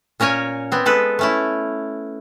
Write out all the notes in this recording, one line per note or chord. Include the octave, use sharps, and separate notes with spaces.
A#2 C#4 A#4 C#5 G#5
B3 C4
G#3 A4 B4
A3 C#4 E4